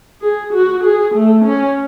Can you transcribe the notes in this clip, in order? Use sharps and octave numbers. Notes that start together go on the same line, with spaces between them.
G#4
F#4
G#4
A3
C#4